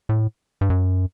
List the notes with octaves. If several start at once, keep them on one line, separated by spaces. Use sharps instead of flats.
A2
G2
F#2